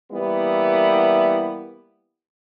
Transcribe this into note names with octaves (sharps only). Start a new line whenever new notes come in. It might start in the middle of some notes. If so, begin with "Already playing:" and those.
E3 G3 A#3 B3 E4